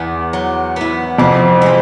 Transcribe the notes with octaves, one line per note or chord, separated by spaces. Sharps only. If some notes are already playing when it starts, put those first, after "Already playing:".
Already playing: E2 B3 E4
F#3
B3 E4
F2 C3
E3 G#3